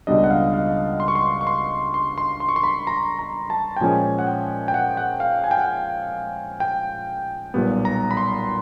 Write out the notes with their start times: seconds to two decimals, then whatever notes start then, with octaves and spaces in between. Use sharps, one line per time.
0.07 C#2 B2 G3 B3 D4 D#5
0.24 F#5
0.31 F5
0.54 F5
1.00 C6
1.08 C#6
1.15 C6
1.41 C#6
1.47 C6
1.94 C6
2.18 C6
2.40 C6
2.49 C#6
2.56 C6
2.63 B5
2.87 A#5
3.19 A#5
3.50 A5
3.76 G5
3.80 A#2 F3 G#3 C#4 G#5
4.19 F#5
4.27 G5
4.68 G5
4.74 F#5
4.97 F#5
5.20 F5
5.44 G#5
5.51 G5
5.58 F#5
5.66 G5
6.60 G5
7.54 B1 A#2 G3 B3
7.85 A#5
8.11 B5
8.17 C6